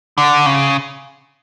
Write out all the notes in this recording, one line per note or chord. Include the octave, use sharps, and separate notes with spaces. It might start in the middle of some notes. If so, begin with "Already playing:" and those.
D3
C#3